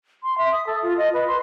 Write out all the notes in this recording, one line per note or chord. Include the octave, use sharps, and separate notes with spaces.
C6
E5
D#6
A4
F4
D#5
B4
C6